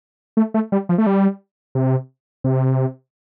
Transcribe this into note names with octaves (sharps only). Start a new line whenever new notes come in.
A3
A3
G3
F3
A3
G3
C3
C3